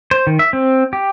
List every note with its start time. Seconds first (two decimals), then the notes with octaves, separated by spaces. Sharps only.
0.11 C5
0.27 D#3
0.39 E5
0.53 C4
0.93 G4